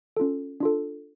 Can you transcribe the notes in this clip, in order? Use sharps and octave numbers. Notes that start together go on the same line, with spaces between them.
C#4 F4 A4
D4 F4 A4